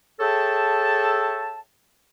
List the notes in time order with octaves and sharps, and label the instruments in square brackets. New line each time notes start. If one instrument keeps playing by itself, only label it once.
[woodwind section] G#4 A4 C#5 E5 G5 A5